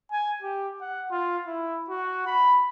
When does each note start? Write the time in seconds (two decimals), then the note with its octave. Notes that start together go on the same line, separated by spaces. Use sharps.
0.12 G#5
0.43 G4
0.81 F#5
1.11 F4
1.47 E4
1.89 F#4
2.27 B5